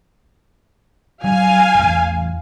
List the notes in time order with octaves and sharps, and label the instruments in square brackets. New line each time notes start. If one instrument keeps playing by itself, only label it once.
[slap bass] F#3 G3 D4 [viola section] F5 G#5
[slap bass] D#1 A1 E2